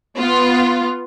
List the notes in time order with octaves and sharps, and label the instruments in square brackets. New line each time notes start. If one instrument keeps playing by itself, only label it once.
[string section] B3 F4